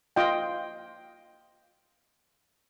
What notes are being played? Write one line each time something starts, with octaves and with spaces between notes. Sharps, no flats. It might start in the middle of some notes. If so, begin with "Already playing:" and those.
F4 D#5 G5